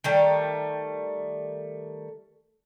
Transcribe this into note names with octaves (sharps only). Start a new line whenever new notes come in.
D#3 G3 A3